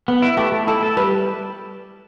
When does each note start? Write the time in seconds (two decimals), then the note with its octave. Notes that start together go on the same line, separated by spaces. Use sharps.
0.08 B3
0.22 E4
0.37 A3 G4
0.52 A3
0.67 E4 A4
0.83 A4
0.97 G3 B4